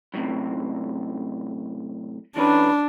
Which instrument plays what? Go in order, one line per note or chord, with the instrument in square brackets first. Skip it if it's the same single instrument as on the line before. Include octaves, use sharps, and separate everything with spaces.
[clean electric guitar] F#2 A2 C3
[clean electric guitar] E3 C#4 B4 [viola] D4